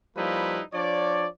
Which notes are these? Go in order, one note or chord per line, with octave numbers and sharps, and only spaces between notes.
F3 G3 A#3 D#4 E4 B4
F3 D4 C#5 D5